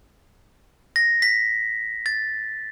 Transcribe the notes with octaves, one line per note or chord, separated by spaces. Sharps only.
A#6
B6
A6